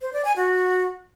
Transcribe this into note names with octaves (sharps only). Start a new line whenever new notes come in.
C5
D5
G#5
F#4